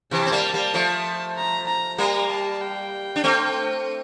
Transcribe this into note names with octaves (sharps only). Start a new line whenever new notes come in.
C3 E3 A5
C4
G3 A#3
G3 A#3
F3 A3
A#5
A#5
G3 A#3 A#5
A5
G5
D4
A3 C4